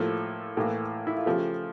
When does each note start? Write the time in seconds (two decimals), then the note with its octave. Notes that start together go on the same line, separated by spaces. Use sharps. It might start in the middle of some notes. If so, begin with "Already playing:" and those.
Already playing: A2 F3 A#3 A4
0.57 A2 E3 A#3
1.07 E4
1.17 F4
1.26 C#3 F3 A3 G4